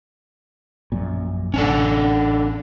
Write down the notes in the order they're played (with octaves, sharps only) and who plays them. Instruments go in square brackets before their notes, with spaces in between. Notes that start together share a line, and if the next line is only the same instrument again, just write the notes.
[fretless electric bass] A#1 F#2 A#2
[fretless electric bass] A1 [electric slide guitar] C#4 D4 A4